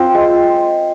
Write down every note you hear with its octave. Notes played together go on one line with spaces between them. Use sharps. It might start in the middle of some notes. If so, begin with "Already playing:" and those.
Already playing: C4 F4 C5
G#3